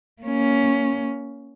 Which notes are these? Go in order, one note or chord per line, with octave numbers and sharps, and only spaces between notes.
A#3 C#4